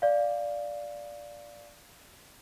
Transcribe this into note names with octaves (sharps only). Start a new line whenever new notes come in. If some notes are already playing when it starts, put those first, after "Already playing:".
D5 F5